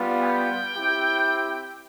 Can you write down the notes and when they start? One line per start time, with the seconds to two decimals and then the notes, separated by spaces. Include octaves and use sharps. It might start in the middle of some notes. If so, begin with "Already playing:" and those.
Already playing: G3 B3 F4
0.22 G5
0.74 C4 E4 G4